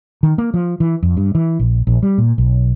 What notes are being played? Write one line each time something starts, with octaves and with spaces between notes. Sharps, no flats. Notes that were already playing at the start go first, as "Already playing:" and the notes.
D#3
A#3
F3
E3
F2
G2
E3
A#1
A#1
G3
A#2
B1